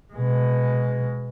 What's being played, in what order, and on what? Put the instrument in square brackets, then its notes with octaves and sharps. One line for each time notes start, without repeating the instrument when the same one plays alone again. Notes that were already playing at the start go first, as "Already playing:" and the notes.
[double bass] B2 G#3